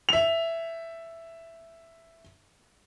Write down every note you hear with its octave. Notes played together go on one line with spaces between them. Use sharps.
E5 F7